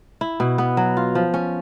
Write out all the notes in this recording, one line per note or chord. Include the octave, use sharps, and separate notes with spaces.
E4
B2
B3
F#3
F4
F3
C#4